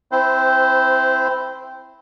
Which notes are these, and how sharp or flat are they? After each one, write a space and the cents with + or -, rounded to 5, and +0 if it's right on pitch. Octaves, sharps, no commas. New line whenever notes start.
C4 +0 E4 +0 C5 -20